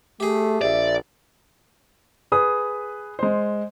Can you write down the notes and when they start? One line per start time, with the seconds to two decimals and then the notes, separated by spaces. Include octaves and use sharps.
0.20 A3 G4 G#4
0.61 A#1 D5 E5
2.32 G#4 B4 D#6
3.19 G#3 C5